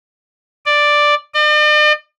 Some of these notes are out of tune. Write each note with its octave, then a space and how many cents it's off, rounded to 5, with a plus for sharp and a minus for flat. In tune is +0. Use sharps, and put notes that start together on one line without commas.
D5 +5
D5 +45